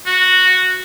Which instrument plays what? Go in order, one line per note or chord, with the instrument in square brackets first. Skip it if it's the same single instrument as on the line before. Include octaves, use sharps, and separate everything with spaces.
[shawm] F#4